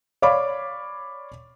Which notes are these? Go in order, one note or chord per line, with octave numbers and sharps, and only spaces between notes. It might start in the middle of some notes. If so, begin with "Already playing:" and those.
C#5 D5 F5 B5 D6